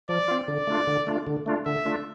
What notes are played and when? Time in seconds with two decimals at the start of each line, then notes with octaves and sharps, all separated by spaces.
0.09 F3 D5
0.28 C4 F4
0.48 D3 D5
0.67 A3 D4 F4
0.87 D3
1.07 A3 D4 F4
1.27 D3
1.46 A3 D4 F4
1.66 D3 E5
1.85 A3 D4 F4